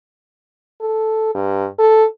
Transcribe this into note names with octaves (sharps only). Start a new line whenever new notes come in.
A4
G2
A4